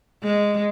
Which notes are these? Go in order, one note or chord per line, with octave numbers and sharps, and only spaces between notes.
G#3